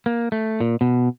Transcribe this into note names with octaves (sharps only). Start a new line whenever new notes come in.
A#3
A3
A#2
B2